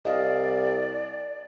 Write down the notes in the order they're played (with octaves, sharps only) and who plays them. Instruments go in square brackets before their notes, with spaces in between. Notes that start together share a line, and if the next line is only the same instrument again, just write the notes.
[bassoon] C2 [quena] D5 [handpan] D#5 F5